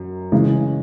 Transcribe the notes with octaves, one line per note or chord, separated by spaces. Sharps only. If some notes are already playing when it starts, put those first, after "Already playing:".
Already playing: F#2
C#3 E3 G#3